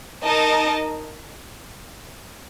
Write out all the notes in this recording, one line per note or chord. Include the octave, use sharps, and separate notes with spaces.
D#4 A#4 D#5 A5